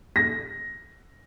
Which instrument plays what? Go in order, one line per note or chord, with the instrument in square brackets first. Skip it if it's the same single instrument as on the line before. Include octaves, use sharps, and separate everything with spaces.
[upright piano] A#6